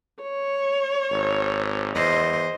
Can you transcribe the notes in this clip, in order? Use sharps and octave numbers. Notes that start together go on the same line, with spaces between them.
C#5
G#1
E2 C5 D#5